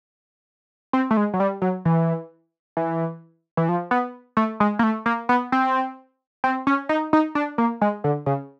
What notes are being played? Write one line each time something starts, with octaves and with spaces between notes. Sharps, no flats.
C4
A3
G#3
F#3
G3
F#3
E3
E3
E3
F3
B3
A3
G#3
A#3
A3
A#3
B3
C4
C4
C#4
D#4
D#4
D4
A#3
G#3
D3
C#3